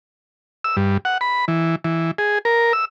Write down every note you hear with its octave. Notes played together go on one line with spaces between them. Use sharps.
E6
G2
F#5
B5
E3
E3
G#4
A#4
E6